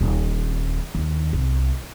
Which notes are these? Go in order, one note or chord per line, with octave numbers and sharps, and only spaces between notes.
D#1
D#2
C2